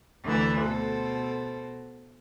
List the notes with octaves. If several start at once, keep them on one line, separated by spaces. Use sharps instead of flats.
D2 D3 E3 E5
B2 A4 C5